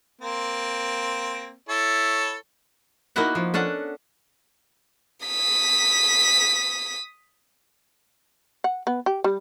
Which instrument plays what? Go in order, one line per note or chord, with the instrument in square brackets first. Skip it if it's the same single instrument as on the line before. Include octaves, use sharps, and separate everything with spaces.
[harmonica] A#3 C4
E4 A4 C#5
[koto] A#3 B3 D#4 E4 F#4 F#5
F3
C#4 D4 A4 F#5
[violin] D#6 B6
[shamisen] F#5
B3
G4
G3